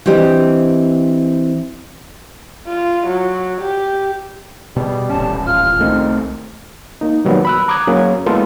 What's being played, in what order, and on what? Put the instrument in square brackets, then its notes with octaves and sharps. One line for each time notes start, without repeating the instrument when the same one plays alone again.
[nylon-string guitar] E3 C4 D4 G4 D#5
[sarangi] F4
F#3
G4
[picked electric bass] B2 [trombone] G3 [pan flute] G#4
[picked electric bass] D#1 A1 C#4 [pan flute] A5
[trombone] F4 [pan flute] F6
[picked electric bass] C2 A3 C4 [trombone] D#3
[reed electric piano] A#3 D#4
B2 D#3 F#3 G3 A#3 B3
B5 E6 F#6
A#5 D6 D#6 F#6 G#6
F#3 A#3 C#4 G#4 C#5
G#3 A#3 B3 E4 F4 A4